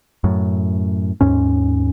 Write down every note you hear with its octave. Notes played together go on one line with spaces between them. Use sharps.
F#2 A2
D#2 G#2 C#4